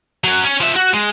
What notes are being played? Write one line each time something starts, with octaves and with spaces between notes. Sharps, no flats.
F#3 C#4
C#4
F3 E5
F#4
G#3